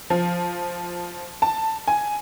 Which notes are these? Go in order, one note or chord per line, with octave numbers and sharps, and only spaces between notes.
F3
A5
G#5